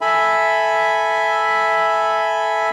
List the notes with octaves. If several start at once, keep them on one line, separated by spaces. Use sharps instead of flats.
A4 E5 G#5 B5